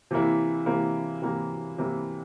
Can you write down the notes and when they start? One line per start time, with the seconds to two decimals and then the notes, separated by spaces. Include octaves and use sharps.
0.11 C3 E3 A#3 E4
0.66 C3 E3 A#3 E4
1.22 C3 E3 A#3 E4
1.78 C3 E3 A#3 E4